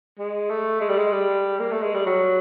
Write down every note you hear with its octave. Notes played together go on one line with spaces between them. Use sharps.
G#3
A3
G#3
G3
G#3
G3
A#3
A3
G#3
G3
F#3